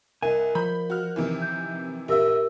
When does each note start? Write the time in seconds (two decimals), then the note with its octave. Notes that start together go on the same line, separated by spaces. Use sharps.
0.22 C2 A#4 D#5 G#5
0.55 F3 B5 G6
0.90 F#4 F6
1.16 C3 D#3 E3
1.42 G6
2.08 A#1 G4 A#4 E5 E6